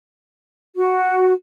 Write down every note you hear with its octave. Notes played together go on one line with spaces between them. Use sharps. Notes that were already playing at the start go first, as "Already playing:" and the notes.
F#4